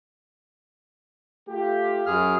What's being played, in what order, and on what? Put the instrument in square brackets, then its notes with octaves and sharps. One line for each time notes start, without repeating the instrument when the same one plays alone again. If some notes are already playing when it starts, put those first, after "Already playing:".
[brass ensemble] A3 F4 G4
[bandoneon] F#2 G#4 F6